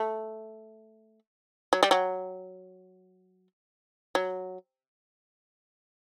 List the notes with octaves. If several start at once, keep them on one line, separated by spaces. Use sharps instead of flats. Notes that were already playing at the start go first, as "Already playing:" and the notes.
Already playing: A3
F#3
G3
F#3
F#3